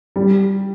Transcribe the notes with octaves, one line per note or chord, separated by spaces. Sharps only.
G3